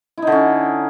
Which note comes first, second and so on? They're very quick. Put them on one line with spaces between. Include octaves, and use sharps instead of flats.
E4 D#4 D3 C#4